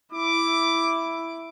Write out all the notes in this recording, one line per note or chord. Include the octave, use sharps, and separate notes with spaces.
E4 D6